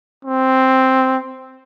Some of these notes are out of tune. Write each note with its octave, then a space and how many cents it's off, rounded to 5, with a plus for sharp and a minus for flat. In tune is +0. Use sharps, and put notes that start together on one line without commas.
C4 +0